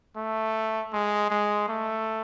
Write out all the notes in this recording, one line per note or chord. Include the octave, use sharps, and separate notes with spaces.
A3
G#3
G#3
A3